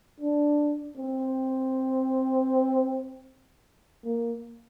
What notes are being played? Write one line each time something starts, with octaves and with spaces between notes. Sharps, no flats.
D4
C4
A#3